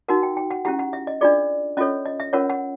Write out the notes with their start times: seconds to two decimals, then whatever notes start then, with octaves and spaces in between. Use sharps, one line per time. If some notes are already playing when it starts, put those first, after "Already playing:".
0.08 D#4 F#4 A#4 F#5
0.23 G5
0.37 G5
0.51 F#5
0.65 C#4 E4 G4 F#5
0.79 F#5
0.93 E5
1.07 D#5
1.21 D4 F4 G#4 D5
1.77 C#4 F4 A4 C#5 D#5
2.05 D#5
2.20 E5
2.33 C#4 F4 A#4 C#5 F#5
2.50 F#5